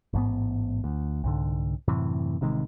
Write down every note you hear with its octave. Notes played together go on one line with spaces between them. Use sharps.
A1 G#2 B3
D2
C2 G#2 D3
F#2 A2 C3 E3
A1 C3 D#3 G#3